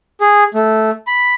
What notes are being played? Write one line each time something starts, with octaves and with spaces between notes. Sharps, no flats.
G#4
A3
B5